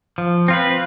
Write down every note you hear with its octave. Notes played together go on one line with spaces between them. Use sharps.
F3
C4 F4 B4